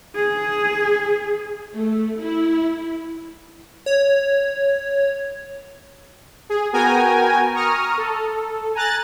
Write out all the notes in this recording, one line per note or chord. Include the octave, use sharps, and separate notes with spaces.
G#4
A3
E4
C#5
G#4
B3 F#4 A#4 G5 G#5 A#5
A#5 C#6 D#6 F6
A4
G#5 A#5 F#6 A6